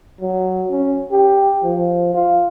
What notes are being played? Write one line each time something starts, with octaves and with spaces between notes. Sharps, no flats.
F#3
C#4
G4
F3
F4